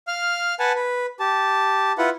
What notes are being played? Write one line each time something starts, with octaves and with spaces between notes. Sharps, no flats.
F5 F6
B4 F#5 G#5 A5
B4
G4 A5
E4 F4 B4 F#5